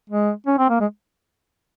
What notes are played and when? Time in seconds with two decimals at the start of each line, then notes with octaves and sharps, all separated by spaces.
0.10 G#3
0.47 C#4
0.58 C4
0.70 A#3
0.80 G#3